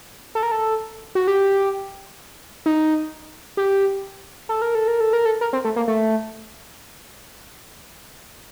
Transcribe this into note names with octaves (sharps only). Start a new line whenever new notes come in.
A4
A#4
A4
F#4
G4
D#4
G4
A4
A#4
A4
A#4
A4
A#4
A4
A#4
C4
A3
A#3
A3